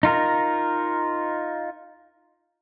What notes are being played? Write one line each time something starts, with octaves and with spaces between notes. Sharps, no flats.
D#4 F4 A#4